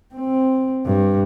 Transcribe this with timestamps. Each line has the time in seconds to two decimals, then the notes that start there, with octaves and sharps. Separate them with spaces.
0.15 C4
0.85 G2